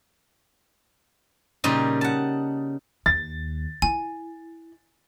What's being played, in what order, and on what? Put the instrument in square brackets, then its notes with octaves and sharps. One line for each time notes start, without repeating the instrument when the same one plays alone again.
[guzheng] A#2 C#3 G3 D#4
F#5 A5
[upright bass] D#2 [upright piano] A6
[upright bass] E4 [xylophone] G#5